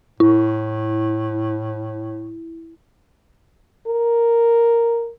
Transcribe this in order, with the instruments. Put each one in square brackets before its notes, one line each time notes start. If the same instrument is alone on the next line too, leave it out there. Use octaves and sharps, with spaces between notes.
[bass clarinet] A2 [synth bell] E4
[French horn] A#4